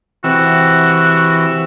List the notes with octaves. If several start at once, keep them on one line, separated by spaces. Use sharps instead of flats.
C3 E3 F#4 E6